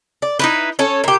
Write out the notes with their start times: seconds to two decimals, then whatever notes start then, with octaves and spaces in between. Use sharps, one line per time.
0.22 D5
0.39 D#4 E4 B4
0.79 C#4 A4 C#5
1.04 A#2 G4